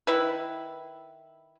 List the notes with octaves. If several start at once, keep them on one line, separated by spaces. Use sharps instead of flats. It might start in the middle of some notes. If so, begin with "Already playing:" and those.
D#3 E4 B4